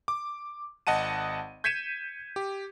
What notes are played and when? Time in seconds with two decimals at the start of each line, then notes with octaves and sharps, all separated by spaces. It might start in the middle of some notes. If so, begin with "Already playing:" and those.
0.08 D6
0.87 G#1 D#5 F#5 A5 D#7
1.64 G6 G#6 B6 C#7 D#7 E7
2.36 G4